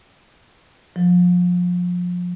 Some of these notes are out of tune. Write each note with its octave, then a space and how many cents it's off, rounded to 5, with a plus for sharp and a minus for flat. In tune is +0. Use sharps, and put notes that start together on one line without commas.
F3 +30